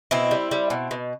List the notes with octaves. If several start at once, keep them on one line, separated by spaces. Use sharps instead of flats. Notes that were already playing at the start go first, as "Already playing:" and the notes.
B2 C4 E4
G3
G3
B2
B2